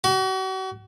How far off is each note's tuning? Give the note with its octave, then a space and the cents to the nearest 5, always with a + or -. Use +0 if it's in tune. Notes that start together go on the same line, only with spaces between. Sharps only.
F#4 +40